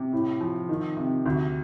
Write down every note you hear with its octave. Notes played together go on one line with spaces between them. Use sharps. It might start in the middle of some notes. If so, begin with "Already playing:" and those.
Already playing: C3
A2
F3
D#3
C3
D2